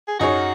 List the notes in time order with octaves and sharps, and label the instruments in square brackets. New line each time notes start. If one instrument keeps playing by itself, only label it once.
[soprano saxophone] G#4
[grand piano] F#2 F#3 D#4 G#4 C#5 [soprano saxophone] F#4